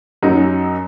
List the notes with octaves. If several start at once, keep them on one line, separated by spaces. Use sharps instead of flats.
F#2 F#3 D#4